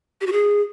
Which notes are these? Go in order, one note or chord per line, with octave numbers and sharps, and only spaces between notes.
G4
F#4
G#4